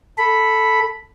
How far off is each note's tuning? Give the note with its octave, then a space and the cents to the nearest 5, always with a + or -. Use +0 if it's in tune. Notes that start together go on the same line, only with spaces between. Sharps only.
A4 +0 B5 +0